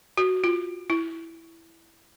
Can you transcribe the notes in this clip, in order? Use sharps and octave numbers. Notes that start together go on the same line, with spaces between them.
F#4
F4
E4